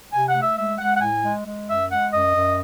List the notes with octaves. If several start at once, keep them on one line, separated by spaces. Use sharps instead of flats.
C3 G#5
F#5
A3
E5
G#3 E5
G#3 F#5
F#5
A2 G#5
G#3
G#3
F#2 E5
G#3 F#5
F#2 D#5
F#2